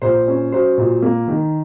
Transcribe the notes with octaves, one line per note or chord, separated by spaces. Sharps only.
A#2 C5
C#4
F#3 C5
A#2
A#3
D#3